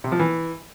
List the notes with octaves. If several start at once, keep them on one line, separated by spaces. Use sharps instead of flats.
C3
F3
E3